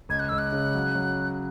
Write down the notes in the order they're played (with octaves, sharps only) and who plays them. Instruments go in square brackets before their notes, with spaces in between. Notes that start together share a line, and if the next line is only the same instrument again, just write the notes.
[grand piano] C#2 [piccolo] G#6
[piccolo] F#6
[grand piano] C#2 [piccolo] E6
[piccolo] F#6
[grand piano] C#3
F#3
F#3